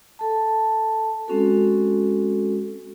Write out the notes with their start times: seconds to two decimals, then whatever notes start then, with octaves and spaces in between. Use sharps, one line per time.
0.19 A4 A5
1.28 G#3 C4 C#4 F#4 A4